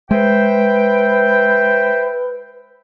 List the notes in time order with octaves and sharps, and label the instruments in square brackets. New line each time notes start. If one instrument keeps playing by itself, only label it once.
[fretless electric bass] G#3 [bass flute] B4 [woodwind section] C5 E5 G5